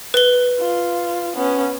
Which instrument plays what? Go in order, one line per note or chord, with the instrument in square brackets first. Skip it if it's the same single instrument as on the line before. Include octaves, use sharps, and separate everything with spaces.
[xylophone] B4 G7
[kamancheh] F4
B3 C#4